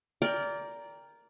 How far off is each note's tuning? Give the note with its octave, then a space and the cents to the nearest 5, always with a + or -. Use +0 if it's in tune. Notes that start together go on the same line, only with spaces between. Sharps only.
A#4 +0 D5 -20 G5 +15